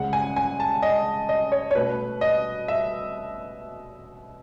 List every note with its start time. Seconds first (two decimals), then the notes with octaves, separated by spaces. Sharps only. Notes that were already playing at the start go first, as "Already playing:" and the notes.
Already playing: C#2 C#3 G#3 F#5
0.13 G#5
0.36 G#5
0.60 A5
0.83 D#5
1.29 D#5
1.52 C#5
1.71 C#5
1.75 B2 A3 C#4 B4
2.21 D#5
2.68 E5